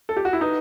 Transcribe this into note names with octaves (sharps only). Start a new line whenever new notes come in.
A4
G4
F#4
E4
D#4 B4